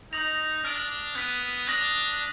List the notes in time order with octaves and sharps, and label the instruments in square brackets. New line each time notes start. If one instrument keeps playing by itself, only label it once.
[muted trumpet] D#4 [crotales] D#6 A#6 F7
[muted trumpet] D4 [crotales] F6 A#6 D7 F#7
[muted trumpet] B3 [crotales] F#6 B6 D#7
[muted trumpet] D4 [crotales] D#6 A#6 F7